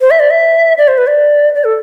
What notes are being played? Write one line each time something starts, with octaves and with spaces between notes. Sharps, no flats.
C5
E5
D5
E5
D5
C5
B4
D5
D5
A4